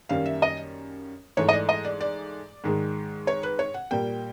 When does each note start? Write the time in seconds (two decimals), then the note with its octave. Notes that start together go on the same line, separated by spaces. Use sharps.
0.09 F#2 D#3 G3 A#3 F5
0.26 E5
0.42 D#5
1.37 G#2 E3 A3 C#5
1.49 D#5
1.53 D5
1.69 D#5
1.85 D5
2.01 D5
2.64 G#2 D#3 G#3
3.27 C#5
3.43 B4
3.59 C#5
3.74 F#5
3.91 A#2 G3 A#3 G5